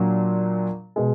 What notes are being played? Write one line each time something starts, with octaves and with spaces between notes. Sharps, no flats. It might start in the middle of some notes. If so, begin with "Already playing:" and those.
Already playing: A#2 F#3 A#3 D4
B2 G#3